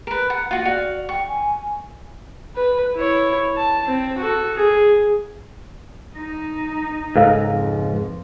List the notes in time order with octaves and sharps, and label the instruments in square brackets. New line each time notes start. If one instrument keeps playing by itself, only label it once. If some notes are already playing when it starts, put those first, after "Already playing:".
[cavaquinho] A#4 B4
F#5
[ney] A#3 [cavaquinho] F4 F#4
[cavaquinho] F#4 F5 [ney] D5
[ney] G5 [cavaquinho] C#6
[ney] G#5
[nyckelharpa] B4
E4 C#5
A5
C4
F#4 A4
G#4
[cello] D#4
[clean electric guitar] C#2 G#2 [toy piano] A4 A#4 F5
[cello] F2